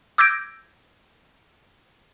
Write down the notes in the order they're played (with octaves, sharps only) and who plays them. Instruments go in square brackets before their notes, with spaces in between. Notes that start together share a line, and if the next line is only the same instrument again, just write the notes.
[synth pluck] D6 E6 G6 G#6 A#6 D7